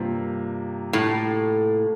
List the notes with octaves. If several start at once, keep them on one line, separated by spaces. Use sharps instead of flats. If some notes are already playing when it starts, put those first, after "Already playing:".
Already playing: G2 C3 F3 A#3
A2